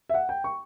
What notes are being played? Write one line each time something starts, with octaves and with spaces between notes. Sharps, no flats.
E5
F#5
G5
C#6